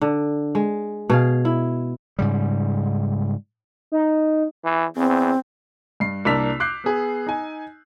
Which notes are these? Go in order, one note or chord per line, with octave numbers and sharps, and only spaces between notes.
D3
G#3
B2 G#4 F5
E4
G#2 C#3 G3
D#4
E3
E2 C4
G2 C7
C2 A#3 D4 E6 B6 F7
D6 F#6 G6 C7
B3 G#4
D#4 G#5